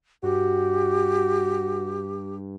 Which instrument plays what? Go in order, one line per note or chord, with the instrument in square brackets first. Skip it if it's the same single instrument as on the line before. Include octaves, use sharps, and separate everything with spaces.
[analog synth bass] G2 [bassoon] F#4 [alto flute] G4